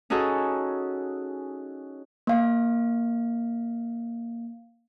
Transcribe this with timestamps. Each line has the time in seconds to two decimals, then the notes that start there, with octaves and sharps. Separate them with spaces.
0.10 C#4 D#4 F#4 G#4 A4
2.27 A#3 F5